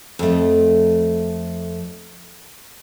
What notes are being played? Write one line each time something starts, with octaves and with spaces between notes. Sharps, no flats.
F2 A3